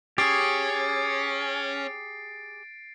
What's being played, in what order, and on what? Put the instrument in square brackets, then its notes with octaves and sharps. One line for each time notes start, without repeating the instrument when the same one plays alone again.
[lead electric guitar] C#4 [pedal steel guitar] G4 G#4 [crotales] A6 C7 D7